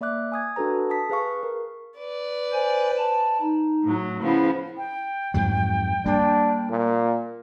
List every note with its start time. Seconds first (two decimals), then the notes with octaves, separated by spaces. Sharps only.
0.01 A#3 D5 E5 D6 F#6
0.32 G#5 D#6 G#6
0.56 D4 F#4 A4 B4 A#5
0.90 A5 D#6 B6
1.10 G#4 B4 F5 C#6
1.43 A#4
1.96 B4 D5
2.53 C5 G#5
2.98 A5
3.41 D#4
3.84 A2 F#3
4.23 C#3 F3 B3 E4
4.77 G5
5.34 F2 G#2 F#3
6.06 G3 A#3 D4
6.70 A#2